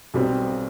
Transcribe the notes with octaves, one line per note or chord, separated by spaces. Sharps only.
B1 B2 G3 C4